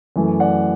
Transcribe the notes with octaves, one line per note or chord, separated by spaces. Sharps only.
F#2 E3 A3
D5 F#5